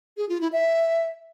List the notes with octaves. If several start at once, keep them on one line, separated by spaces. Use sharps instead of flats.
G#4
F4
E4
E5